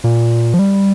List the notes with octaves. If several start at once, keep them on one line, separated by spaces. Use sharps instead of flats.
A#2
F3
G3